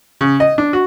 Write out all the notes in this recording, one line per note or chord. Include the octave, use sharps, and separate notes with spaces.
C#3
D#5
D4
F#4